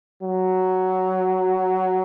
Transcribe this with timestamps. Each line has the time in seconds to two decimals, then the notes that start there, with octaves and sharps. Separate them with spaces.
0.22 F#3